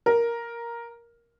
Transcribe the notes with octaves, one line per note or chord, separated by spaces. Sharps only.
A#4